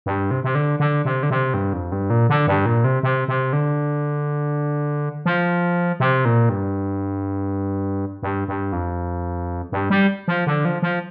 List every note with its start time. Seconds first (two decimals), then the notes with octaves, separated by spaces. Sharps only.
0.06 G2
0.31 C3
0.44 C3
0.55 D3
0.80 D3
1.05 C3
1.23 D3
1.30 C3
1.54 G2
1.73 F2
1.92 G2
2.10 A#2
2.29 D3
2.47 G2
2.66 A#2
2.84 C3
3.03 C3
3.28 C3
3.53 D3
5.26 F3
6.00 C3
6.25 A#2
6.49 G2
8.23 G2
8.48 G2
8.73 F2
9.72 G2
9.90 G3
10.28 F3
10.46 D3
10.65 F3
10.82 F3